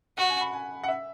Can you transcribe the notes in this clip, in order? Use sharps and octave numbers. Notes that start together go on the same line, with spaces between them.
F#4 F#5
G#5
B5
G#5
F#5
E5